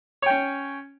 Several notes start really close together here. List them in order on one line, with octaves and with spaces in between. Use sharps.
C#5 G5 C#4